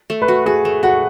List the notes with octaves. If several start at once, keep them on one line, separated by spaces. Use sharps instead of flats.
A3
B4
F#4
F#4 G#4
A3
F#4 F#5